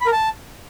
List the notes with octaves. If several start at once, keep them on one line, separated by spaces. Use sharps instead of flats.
B5
A#4
A5